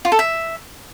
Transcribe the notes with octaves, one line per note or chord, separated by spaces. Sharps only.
F4
A4
E5